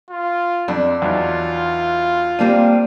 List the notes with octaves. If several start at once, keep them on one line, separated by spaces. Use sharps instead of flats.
F4
F2 D4
E2 F#3 D#4 F4
G3 A#3 C4 D4 D#7